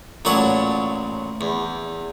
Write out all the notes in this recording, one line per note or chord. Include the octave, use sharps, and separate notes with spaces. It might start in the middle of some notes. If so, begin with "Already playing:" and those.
A1 A#2 F#3 C#5 F#5 A5
E2